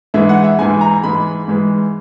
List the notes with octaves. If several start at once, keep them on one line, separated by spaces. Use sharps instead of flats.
G#2 E3 G#3 E5
F#5
E5
G#2 E3 G#3 G#5
A#5
G#2 E3 G#3 B5
G#2 E3 G#3